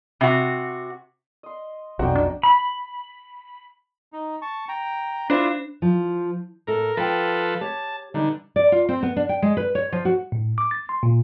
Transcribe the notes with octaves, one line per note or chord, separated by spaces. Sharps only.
C3 F#4
D#5 C6
B1 F2 C3 D#4 F#4 C5 D5 G5
D4
B5
D#4
A5 C#6
G5 A#5
D4 E4 F4 C5 D5
F3
A2 A4 A#4
F3 A4 B4 F#5 G5
G4 C#5 A5
D3 E3 G3 D#4
D5
F4
C4
B3
D4
G5
G#3
B4
C#5
F3
F#4
A2
D6
A6
C6
A#2